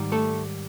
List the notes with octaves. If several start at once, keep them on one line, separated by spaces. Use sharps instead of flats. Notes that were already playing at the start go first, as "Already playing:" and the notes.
Already playing: G#2 D#3 G3
A3 A4